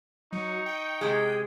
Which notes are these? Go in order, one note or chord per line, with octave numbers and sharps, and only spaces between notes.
F#3 D#4 C#6
G5
C3 G#3 G#4